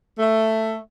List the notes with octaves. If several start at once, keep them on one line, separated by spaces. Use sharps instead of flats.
A3